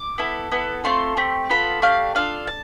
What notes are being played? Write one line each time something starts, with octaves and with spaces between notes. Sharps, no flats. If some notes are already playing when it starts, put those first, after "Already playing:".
Already playing: D6
B3 E4 A4
B3 E4 A4
A3 C4 F4 A4 C6
A3 C4 G4
B3 F4 A4 B5
A3 D4 G4 F5
D4 F4 A4 F5
A5